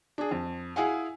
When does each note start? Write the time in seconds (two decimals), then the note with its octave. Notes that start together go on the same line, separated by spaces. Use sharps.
0.18 D4 G#4
0.31 F2
0.76 E4 G#4 F5 F#5 G#5